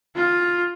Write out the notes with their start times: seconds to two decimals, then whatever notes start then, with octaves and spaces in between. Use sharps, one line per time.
0.16 F4